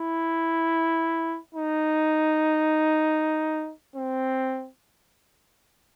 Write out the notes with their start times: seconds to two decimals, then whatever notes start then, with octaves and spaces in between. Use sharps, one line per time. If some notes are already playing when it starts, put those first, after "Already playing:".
Already playing: E4
1.55 D#4
3.96 C4